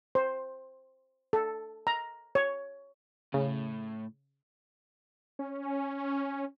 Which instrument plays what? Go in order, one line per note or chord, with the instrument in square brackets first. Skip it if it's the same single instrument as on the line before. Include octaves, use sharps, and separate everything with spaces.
[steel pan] C5
A4
A#5
C#5
[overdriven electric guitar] A2 [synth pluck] C#3
[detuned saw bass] C#4